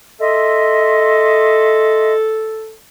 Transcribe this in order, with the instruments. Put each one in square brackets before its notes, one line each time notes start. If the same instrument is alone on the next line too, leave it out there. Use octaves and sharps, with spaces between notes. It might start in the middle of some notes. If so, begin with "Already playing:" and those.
[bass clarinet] A4 [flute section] D#5 E5 C6